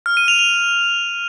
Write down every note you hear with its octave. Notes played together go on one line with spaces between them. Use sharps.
F6
D#7
F7
F7